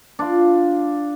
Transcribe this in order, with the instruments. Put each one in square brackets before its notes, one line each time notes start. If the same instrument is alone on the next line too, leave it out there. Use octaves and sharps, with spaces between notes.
[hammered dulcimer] D4 F4